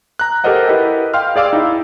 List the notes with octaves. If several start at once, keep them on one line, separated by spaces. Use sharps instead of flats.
A#5 F#6
G4 A4 A#4 C5 D#5 F#5
E4 G4 A#4 B4 D#5 F#5
F5 G5 C6 F6
G#4 D5 F5 D6 E6
D#4 E4